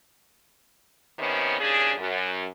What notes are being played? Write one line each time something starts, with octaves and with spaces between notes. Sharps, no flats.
C3 D#3 B3 C#4
D#2 C#3 D4 G#4
F#2